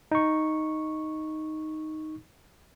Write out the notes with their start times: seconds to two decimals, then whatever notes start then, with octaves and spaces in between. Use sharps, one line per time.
0.11 D#4 C#6